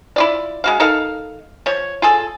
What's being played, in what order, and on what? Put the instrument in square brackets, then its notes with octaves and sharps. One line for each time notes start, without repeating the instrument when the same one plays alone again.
[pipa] E4 F4 D5
G#3 F#4 F5
D#4 A4 A#4 F5
F3 C#5
F4 G#4 A4